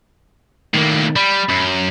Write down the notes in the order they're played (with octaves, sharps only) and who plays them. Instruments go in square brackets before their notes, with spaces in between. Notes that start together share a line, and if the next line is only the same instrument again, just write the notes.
[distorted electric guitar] A2 A#3 [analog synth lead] D#3
[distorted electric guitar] G3 [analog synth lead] B5
[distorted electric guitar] F#2